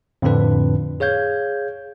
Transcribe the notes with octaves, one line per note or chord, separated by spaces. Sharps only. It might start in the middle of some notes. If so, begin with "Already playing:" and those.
F2 A2 D3 D4 B4
G#4 C#5 F5 G6 G#6